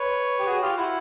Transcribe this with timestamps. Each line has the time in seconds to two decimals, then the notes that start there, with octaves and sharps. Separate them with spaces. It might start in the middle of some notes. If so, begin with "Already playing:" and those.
Already playing: B4 C#5
0.39 G4
0.46 F#4 G#4
0.62 F4 G4
0.77 E4 F#4